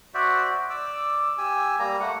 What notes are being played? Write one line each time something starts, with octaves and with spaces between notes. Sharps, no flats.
F#4 C5 D5 E5
D5 D6 E6
G4 G#5 E6
G3 A#3 A#5
A3 F#5